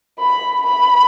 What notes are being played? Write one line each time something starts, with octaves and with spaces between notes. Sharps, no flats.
B5
B5